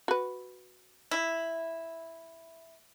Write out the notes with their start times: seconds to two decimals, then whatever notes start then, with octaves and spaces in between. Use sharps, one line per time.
0.08 F#4 B4
1.11 E4